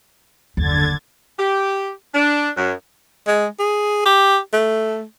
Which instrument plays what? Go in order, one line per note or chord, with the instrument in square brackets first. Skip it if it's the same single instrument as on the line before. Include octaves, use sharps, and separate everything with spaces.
[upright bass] F#1 D#2 [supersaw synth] D3 G#6 A6
[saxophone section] G4
D4
F#2
[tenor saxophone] G#3
G#4
G4
A3